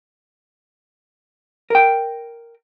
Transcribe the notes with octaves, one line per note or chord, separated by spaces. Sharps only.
A#4 G5